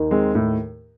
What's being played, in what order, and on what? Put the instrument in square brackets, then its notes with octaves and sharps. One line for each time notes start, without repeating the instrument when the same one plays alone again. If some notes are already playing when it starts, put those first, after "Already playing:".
Already playing: [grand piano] D#2 D#3
[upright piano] G#3 C4
A2